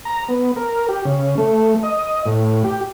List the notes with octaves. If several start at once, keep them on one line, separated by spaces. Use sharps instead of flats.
A#5
B3
A#4
G4
C#3
A3
D#5
A2
G4